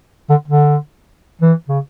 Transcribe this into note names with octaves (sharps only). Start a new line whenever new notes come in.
D3
D3
E3
C#3